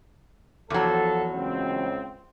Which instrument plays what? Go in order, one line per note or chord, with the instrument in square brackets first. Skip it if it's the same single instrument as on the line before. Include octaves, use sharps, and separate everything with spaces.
[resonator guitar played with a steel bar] E2 F#3 [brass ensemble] F3 A4
[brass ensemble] C#2 C4